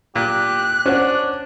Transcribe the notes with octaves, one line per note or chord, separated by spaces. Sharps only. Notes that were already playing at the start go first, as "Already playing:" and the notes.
A#2 G4 F#6
C#4 D4 C5 F#5